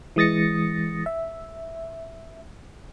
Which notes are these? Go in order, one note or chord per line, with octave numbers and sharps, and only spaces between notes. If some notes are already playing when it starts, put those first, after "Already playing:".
E3 G#3 D#6 A6 A#6 C#7
E5